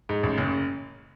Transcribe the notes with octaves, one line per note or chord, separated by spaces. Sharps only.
G#2
A1
F#1